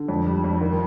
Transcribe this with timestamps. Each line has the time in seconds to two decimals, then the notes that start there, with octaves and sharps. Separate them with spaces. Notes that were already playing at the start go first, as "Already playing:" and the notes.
Already playing: D3
0.08 F2
0.26 G3
0.44 F2
0.61 D#2